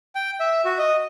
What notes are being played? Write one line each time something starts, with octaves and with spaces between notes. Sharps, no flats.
G5
E5
F#4
D#5